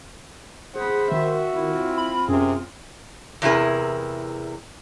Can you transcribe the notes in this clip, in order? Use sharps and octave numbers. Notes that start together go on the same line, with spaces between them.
G#4 C5 F#5 B5
D#3 F#4 E5
C4 E4 F4
B5
F#2 C3 G#4
E2 C3 E4 G#4 A#4